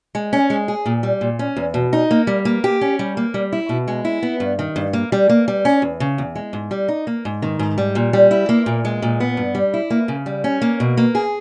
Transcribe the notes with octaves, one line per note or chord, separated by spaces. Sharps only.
G#3
C#4
G#3
G#4
A#2
G3
A#2
C#4
E2
B2
D#4
A#3
G3
A#3
G4
C#4
G3
A#3
G3
E4
B2
G#3
E4
B3
G2
D#3
G2
A#3
G3
A#3
G3
C#4
E2
C#3
E2
G#3
G#2
G3
D#4
A#3
G#2
D#3
G#2
G3
A#2
G3
E4
A#3
A#2
G#3
A#2
B3
G2
G3
E4
A#3
C#3
G3
C#4
A#3
B2
A#3
G#4